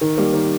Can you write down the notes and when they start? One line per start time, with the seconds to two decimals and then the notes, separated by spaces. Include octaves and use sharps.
0.01 D#3
0.17 G3 A#3
0.34 D#3